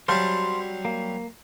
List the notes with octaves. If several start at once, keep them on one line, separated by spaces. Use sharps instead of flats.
F#3 G3 C4 C5 F5 A5
A#3